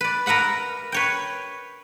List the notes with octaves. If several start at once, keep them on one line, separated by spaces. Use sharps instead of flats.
B4 D5
A#4 B4 E5 F#5 B5
B4 C#5 G5